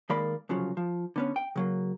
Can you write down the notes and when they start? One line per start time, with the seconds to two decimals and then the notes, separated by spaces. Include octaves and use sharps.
0.10 D#3 G#3 A#3 D5 B5
0.49 C2 C#3 F3 F#3
0.77 F3
1.16 D3 B3 C#4
1.36 G5
1.56 C#3 F#3 A#3